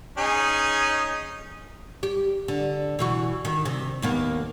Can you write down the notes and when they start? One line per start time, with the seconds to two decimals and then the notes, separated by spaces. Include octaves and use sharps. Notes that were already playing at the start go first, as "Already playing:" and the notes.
0.18 C#4 D#4 G#4
2.03 G4
2.48 D3
2.99 B2 E3 F#4
3.45 D#3
3.65 C3
4.02 D#2 A#3 B3